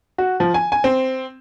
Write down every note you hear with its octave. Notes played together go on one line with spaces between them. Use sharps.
F#4
F3
G#5
G#5
C4